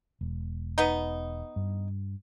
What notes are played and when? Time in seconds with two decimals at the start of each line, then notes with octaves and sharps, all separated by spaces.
0.21 E1
0.78 B3 D#4
1.56 G2